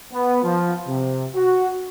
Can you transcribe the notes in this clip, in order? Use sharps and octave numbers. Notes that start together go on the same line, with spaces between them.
B3
F3
C3
F#4